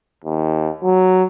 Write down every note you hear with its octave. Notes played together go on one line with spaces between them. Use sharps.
D#2
F#3